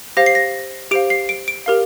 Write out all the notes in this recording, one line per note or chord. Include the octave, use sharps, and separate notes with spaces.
G4 C5 F5 A#6
C7
A#6
G4 C5 F5 D7
C7
D7
D7
G4 A#4 F5